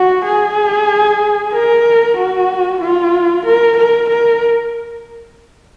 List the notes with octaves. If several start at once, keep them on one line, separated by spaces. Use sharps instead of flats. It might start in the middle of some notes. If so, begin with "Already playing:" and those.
Already playing: F#4
G#4
A#4
F#4
F4
A#4
A#4
A#4